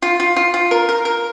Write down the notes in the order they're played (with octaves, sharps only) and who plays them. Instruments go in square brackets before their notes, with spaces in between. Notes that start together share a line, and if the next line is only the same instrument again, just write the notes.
[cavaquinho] F4
F4
F4
F4
A#4
A#4
A#4